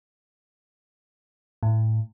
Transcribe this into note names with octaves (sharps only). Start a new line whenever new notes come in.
A2